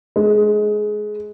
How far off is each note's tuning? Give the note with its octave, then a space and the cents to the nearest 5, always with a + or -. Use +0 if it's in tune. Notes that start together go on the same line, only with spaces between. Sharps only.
G#3 +20